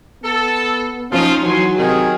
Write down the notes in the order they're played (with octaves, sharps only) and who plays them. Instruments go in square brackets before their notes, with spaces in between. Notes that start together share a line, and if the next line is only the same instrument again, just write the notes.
[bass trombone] B3 [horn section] A4
[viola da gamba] F3 D#4 [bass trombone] C#4 [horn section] F4
[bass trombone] E3 [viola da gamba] F#3 [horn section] G#5 C6
[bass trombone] C3 [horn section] D#3 G#4